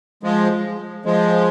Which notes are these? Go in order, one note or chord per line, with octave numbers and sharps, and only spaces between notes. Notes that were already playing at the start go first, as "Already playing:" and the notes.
F3 G#3
F3 G#3